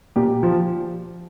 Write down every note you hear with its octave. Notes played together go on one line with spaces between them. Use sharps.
A#2 G4
F3